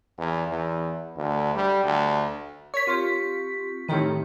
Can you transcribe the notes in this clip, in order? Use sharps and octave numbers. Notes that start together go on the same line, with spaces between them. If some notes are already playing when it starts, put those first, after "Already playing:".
E2
E2
D2
G3
D2
A#4 C#5 C#6 B6
C4 F4 G4
A2 D#3 C4 G4 C#5